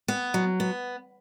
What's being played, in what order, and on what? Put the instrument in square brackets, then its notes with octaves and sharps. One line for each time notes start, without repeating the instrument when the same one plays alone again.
[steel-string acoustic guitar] B3
F#3
B3